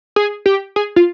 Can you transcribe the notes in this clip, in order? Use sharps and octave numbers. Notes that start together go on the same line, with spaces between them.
G#4
G4
G#4
F4